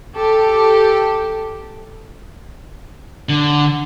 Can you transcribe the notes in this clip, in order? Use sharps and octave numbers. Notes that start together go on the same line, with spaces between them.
G4 A4
D3